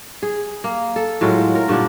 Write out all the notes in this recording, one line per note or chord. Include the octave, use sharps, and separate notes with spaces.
G#4
A#3
A4
A2 F#3 G#3 F4
A#4
G2 A#2 D3 D4